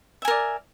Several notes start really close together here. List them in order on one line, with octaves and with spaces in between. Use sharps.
E5 G#5 A#4 D5